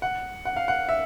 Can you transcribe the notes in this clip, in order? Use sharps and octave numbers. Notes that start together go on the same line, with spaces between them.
F#5
F#5
F5
F#5
E5